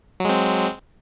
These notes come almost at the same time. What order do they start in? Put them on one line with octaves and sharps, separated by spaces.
F#3 G#3 C4